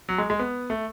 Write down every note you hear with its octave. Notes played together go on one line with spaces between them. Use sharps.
F#3
G#3
G#3
B3
A3